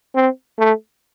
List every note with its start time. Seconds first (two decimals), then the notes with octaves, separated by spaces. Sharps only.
0.15 C4
0.59 A3